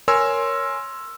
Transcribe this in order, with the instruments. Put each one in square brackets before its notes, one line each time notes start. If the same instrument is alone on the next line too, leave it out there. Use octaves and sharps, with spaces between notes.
[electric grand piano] A#4 C#5 G#5 C6 E6